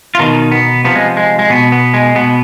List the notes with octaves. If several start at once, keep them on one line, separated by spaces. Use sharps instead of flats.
F4
B2 D#3 D#4
B3
C3 F3 B3
G#3
G#3
G#3
B2 B3
B3
G#3
B2 B3